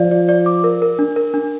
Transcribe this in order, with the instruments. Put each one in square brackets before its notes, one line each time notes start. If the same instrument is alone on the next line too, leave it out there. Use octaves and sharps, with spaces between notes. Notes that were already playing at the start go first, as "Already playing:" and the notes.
Already playing: [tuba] F3 [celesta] D5 F5
[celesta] D5
D5
D6
A#4
A#4
D4
A#4
D4